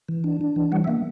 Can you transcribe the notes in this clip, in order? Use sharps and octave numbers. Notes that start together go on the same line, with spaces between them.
E3
D4
D4
E3
G3 F#5
E5
A#3